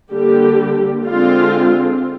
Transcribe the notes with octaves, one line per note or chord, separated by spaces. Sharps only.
D3 G3 A#3 G4
D3 G#3 C4 F4